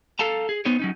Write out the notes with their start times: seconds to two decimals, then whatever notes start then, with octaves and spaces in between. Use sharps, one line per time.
0.19 A4 F5 A5 A#5
0.49 G#4
0.65 B3 D#4 C5 C#5
0.79 F#3 C#4 D#4